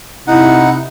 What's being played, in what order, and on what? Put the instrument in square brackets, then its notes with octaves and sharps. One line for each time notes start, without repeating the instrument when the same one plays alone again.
[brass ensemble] C3 E4 [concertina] D#4 F#5